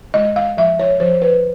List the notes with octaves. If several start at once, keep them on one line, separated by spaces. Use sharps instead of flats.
G#3 D#5
F5
F3 E5
C#5
F3 C5
B4